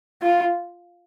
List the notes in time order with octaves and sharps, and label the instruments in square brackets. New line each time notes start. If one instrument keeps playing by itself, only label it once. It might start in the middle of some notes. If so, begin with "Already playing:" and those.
[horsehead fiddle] F4